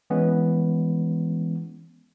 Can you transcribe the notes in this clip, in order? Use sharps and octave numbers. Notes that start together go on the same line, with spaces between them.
E3 G#3 B3 C#4